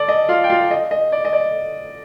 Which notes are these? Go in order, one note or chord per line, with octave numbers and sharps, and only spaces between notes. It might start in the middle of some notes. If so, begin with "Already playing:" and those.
Already playing: A4 D5
D#5
F4 F5
G5
F4 F5
D#5
D#5
D5
D#5
D5